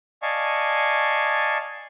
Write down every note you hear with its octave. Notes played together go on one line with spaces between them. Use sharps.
D5 D#5 F5 G#5 A5 C#6